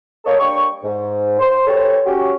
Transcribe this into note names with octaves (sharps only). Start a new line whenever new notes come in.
A#3 A4 C#5 D#5
G3 A#3 D4 G5 C#6
G#2
C5
E3 G4 A4 C5 C#5
C#4 F#4 G4